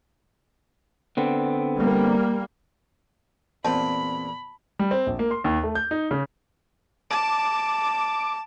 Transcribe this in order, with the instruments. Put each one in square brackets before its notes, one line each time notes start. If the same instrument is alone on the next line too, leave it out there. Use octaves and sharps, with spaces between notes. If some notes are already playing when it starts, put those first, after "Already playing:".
[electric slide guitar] D3 B3 C4
[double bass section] G3 A#3
[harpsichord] E2 A#2 [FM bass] C4 [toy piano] A5 [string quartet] B5
[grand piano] G3
C4
A#1
A#3
C6
D#2
A3
G6
D#4
C#3
[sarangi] A5 [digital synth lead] D6